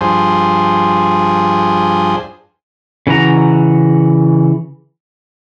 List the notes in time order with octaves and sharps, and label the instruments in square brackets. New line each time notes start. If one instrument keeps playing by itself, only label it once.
[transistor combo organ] G2 F3 G#4 C5
[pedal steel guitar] C#3 E3 F#4 A#5